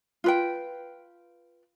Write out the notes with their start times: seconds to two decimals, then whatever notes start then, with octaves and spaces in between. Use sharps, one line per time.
0.24 F4 B4 G5